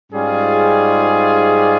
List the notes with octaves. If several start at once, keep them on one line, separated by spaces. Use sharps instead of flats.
G#2 G3 C#4 F4 G#4